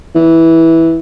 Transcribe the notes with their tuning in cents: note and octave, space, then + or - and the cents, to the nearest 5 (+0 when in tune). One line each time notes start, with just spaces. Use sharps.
E3 -10